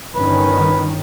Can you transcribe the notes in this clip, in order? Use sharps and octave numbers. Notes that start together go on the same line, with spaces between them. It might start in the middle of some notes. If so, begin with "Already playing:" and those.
G1 D#3 C#4 B4